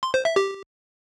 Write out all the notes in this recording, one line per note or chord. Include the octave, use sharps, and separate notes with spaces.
C6
C5
E5
G4